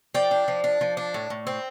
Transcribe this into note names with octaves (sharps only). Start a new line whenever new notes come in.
F3 D5 G5
D4
F3
D4
F3
D4
A2
A2
C4